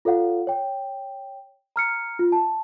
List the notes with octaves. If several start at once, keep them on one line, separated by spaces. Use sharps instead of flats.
F4 A4 C#5 F5 F#5
C#5 G5
A#5 F6 C#7
F4
A5